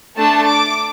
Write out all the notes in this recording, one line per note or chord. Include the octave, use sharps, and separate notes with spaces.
A3 D4 A4 A5
D6